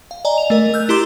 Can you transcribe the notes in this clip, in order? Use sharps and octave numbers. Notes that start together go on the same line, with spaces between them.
F5
D5 D#5 G#5 A#5
F7
A3 A#4 D#5
E6 F#6 G6
E4 G4 A#5 C6 D6